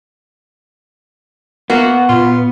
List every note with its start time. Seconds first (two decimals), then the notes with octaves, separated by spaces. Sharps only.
1.70 A#3 B3 F#4
2.09 A#2 F4